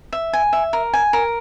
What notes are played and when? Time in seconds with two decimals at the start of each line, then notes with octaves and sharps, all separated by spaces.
0.13 E5
0.33 G#5
0.53 E5
0.73 A#4
0.94 G#5
1.13 A#4